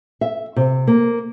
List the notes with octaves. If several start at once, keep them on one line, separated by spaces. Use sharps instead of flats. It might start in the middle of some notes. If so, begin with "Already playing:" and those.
E5
C3
A#3